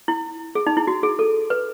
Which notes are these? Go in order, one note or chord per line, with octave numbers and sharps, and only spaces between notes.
E4
G#4
D#4
E4
F#4
G#4
A4
B4